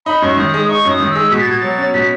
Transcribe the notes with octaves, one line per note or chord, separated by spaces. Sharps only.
D#4 B5
F#2 C#6
D#3 D#6
G#3 D#6
D#4 C#6
F#2 D#6
D#3
G#3 E6
B2 B6
A6
B2 G#6
F#3 A6
C#4
B2 B6